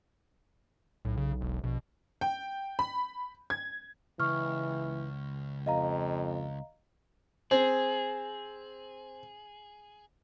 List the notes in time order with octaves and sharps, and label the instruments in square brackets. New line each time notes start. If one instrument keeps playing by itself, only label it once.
[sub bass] B1 [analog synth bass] A2
[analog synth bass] C#3
E1
[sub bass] A#1 [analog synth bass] B2
[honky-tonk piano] G5
B5
G#6
[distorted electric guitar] C#2 [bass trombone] E3 [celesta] C#6 F6
[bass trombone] F2 [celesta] D#5 F5 A#5
[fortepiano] C4 [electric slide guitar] G#4